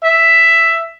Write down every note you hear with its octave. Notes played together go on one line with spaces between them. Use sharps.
E5